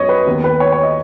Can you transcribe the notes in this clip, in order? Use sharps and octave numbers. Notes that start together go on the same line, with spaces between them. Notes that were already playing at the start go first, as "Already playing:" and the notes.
Already playing: F#2 F#3 B3 C#5 D#5
B4
D#2 D#3 B3
B4
C#5
C#5
D#5